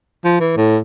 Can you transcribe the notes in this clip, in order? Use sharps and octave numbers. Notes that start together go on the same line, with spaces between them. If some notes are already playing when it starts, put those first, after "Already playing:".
F3
E3
A2